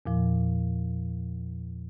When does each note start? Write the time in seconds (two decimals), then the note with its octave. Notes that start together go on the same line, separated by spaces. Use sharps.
0.06 E2 A#2 F3